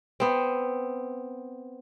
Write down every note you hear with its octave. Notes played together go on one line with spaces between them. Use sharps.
B3 C4